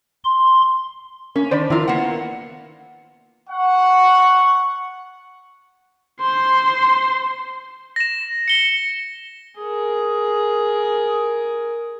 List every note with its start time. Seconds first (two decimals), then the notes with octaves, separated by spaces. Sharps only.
0.25 C6
1.36 A#3 C#4
1.51 D#3 D4 C5 D5 B5
1.70 D#3 F3 E4 F4 A#4
1.88 A#3 B3 F#5
3.49 F#5 C#6
6.21 C5 C6
7.96 A#6 E7
8.48 C#7 G7
9.59 G#4 A#4